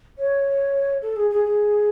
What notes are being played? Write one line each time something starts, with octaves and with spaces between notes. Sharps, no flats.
C#5
A4
G#4
G#4
G#4